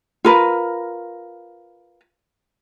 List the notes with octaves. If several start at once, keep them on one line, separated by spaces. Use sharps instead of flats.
F4 A#4 B4